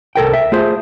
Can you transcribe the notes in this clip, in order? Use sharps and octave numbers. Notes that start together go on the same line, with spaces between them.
C2 A4 A#4 G5
E5
A3 F4 G#4 C5